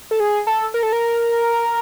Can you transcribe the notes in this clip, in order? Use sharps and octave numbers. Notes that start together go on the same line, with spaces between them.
A4
G#4
A4
A#4
A4
A#4